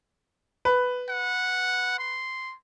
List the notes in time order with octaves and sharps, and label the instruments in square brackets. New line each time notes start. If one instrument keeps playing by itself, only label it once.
[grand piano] B4
[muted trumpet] F#5
C6